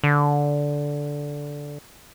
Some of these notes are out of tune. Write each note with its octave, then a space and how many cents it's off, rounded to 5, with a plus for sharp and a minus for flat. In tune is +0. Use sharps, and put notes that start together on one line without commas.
D3 -10